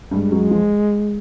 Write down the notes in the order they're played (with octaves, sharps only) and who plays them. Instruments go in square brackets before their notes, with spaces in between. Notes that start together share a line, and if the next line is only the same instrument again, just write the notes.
[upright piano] G2 G3 [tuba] G#3
[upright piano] F#2 F#3
F3